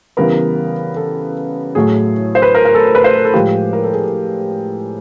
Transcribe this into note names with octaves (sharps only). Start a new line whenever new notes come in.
C#3 E3 G3 B3 A#4
A4
A2 F#3 A3 G#4
C5
B4
A#4
A#4
A4
B4
C5
A#4
A4
A2 F3 G#3 G4
A#4
A4
G#4